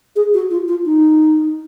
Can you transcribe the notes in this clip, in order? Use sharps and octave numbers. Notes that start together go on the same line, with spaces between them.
G#4
F#4
F4
F4
D#4